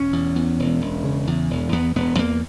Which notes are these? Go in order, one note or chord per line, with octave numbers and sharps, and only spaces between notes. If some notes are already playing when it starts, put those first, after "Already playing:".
Already playing: E1 C#4
E2
E2
E1
E1
C#3
E2
E1
E2 B3
E1 B3
E2 A#3